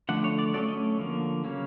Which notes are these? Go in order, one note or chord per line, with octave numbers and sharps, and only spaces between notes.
D3 F3 A3 D4 F#5
C#5
D5
F#3 A3 C#4 D5
D#5
D3 F3 A#3
C#3 F#3 A#3 C#4